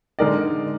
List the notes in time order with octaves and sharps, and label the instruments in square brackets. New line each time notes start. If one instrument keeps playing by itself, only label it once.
[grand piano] D3 G#3 D#4 A#4 D5